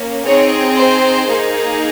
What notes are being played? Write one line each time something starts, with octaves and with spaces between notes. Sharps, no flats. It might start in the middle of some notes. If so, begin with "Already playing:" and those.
Already playing: A#3 C#4
C4 D#4 G#4 C#5
C5
A#3 D#4 G#4